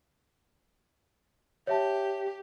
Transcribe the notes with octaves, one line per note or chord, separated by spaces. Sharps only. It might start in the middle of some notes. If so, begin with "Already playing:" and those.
G4 C#5 E5 A5